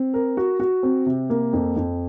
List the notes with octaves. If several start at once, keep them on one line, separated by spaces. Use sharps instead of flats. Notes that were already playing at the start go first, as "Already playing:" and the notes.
Already playing: C4
A#4
F#4
F#4
C4
C3
A#3
F2
F2